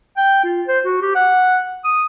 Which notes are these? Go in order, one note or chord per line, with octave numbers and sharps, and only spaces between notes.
G5
F4
C5
F#4
G4
F#5
D#6